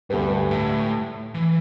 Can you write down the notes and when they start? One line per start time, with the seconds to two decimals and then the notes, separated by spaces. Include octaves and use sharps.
0.10 D2 G2 D3 A3 G4 B4
0.51 A2
1.34 E3